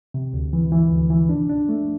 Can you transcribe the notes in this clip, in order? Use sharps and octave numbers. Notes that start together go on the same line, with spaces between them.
C3
D2
E3
E3
D2
E3
D4
D4
A3